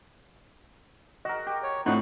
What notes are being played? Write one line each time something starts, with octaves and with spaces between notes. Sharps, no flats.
F#4 A#4 D#5
G4
C#5
A2 C4 D4 D#4 F4 F#5 C#6